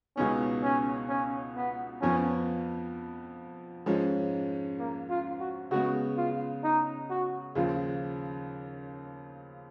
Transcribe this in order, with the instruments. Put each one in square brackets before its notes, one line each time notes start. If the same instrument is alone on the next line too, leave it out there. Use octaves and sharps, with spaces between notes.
[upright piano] C#2 B2 G#3 B3 D#4 [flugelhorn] C#4
[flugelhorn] C#4
C#4
B3
[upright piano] F2 F3 B3 [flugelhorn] C#4
[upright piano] G#2 F3 G#3 C#4
[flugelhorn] A#3
F4
F#4
[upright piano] C#3 G#3 B3 [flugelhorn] F#4
[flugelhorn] F4
D#4
F#4
[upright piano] D#2 C#3 F3 [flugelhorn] F4